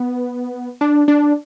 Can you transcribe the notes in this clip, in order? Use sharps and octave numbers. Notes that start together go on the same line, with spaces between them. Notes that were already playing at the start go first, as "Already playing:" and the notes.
Already playing: B3
D4
D4